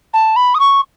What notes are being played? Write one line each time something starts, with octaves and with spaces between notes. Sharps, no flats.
A5
B5
D#6
C#6